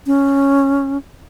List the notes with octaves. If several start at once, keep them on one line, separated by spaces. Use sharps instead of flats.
C#4